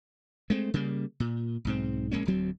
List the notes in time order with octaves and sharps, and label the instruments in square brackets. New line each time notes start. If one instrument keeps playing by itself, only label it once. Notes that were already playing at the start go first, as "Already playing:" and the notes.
[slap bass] G#3 A3 C4
C#3 G3 A#3
A#2
B1 G#2 C4
A#1 G#3 A#3 C#4
D1 D2 F#3 C4